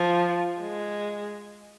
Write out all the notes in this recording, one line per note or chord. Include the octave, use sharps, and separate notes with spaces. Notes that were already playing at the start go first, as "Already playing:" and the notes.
Already playing: F3
G#3